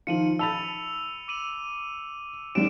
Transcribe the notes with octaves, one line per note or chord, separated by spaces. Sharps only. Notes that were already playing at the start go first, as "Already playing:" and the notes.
D#3 F3 F4 C#7 D#7 F#7
A5 B5 E6 A6 F7
D6 D#7 F#7
D#2 G3 D7 E7